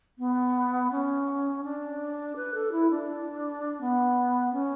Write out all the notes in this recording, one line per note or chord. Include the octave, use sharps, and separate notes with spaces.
B3
C#4
D4
B4
A4
E4
D4
B3
C#4